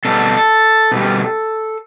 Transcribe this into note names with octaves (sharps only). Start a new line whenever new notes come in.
B2 G3 A4
B2 G3